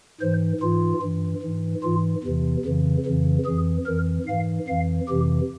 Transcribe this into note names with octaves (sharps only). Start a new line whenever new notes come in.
G#2 E3 C5
G#2 E3 F4
G2 E3
G#2 E3
G#2 E3 F4
E2 C3 E3
F2 C#3 E3
F2 C#3 E3
F2 E3 G#4
F2 E3 A#4
G#2 E3 F5
F2 E3 F5
F2 C3 E3 G4